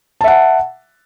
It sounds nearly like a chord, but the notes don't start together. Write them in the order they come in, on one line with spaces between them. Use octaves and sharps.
A5 E5 F#5